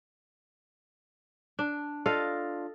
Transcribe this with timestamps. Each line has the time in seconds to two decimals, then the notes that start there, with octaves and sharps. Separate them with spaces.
1.59 D4
2.06 D4 F4 A4 D#5 F5